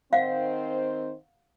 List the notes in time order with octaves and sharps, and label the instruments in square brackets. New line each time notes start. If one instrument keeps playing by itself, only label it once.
[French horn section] D#3 C4 C5 [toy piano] F5 F#5